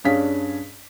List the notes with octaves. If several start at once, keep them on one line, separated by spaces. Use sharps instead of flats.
G2 C#4 D4 G#4 F5 B6